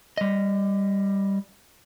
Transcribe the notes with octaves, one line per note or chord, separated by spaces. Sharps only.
G3 D#5